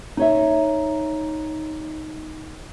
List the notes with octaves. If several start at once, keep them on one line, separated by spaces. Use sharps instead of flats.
D#4 C#5 E5